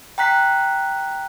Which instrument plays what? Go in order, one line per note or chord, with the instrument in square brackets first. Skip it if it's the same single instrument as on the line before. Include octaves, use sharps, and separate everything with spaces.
[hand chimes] G5 A#5 F#6 B6